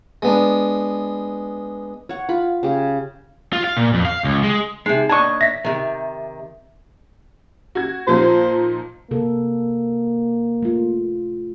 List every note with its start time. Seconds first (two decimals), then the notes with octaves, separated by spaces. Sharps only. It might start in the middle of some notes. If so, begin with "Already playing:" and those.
0.22 G#3 B3 D4
2.09 C#5 F#5
2.29 F4 B5
2.63 C#3 G4
3.53 F4
3.64 F5
3.77 A#2
3.94 F2
4.05 F5
4.24 C#2
4.43 G#3
4.86 C3 G#3 D#4 C7
5.09 D#2 D4 D#5 A5 C#6 G#6
5.41 E5 A#6 B6
5.64 C3 D#3
7.75 F#4 G#6
8.07 A#2 F3 D#4 C5
9.11 C3 A#3 A4
10.62 A3 F4